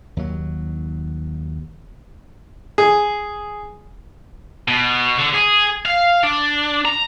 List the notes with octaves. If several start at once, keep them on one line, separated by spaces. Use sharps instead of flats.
D#2 F#3
G#4
B2
D3
G#4
F5
D4
A#5